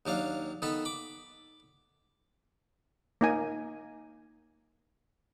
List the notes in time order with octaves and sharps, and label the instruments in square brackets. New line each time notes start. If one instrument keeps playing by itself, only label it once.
[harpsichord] D#2 F#3 D4 F5
D#3 B3 A4 B5
B5 D6
[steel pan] A#3 D#4 G#5